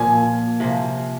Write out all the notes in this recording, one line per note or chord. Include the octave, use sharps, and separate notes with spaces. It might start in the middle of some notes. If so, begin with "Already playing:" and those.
Already playing: A#2 F3 A#3 G#5
C3 F3 A#3